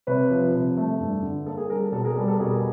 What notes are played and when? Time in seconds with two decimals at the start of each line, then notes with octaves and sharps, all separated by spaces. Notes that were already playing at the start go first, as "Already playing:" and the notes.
0.07 C3 B4 C#5
0.31 F3
0.54 C3
0.77 A3
1.00 G2
1.23 D3
1.46 A#3 A4
1.57 G#4 A#4
1.70 G3 G#4 A#4
1.81 A4
1.92 B2 A4
2.04 G#4 A#4
2.16 G3 A4
2.28 A4
2.39 B2 G#4 A#4